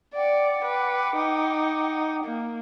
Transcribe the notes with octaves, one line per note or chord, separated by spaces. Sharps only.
D5 F#5 G5 D6
B4
D#4
A#3